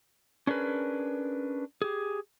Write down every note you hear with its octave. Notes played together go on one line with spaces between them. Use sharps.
C#4 D4 G#4 A#4 B4
G4 G#4